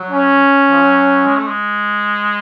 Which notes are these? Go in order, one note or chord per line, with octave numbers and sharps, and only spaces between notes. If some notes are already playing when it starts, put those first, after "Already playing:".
Already playing: F#3
C#4
F3
F#3
G#3
A3
G#3